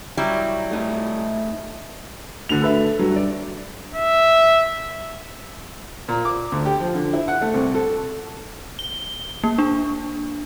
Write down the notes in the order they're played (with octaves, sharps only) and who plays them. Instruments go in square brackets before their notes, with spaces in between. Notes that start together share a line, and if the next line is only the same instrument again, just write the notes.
[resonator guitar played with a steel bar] F#3 G3 E4
[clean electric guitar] A3 D#4
[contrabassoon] D2 [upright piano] D3 F7
[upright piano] A4 B4 E5
[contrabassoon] G2 [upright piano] F#3
[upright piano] D5
[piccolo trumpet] E5
[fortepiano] A#2
D6
D2
G4
F3
D3
E4
F#5
A3
C2
A4
[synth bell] G7
A#3
D4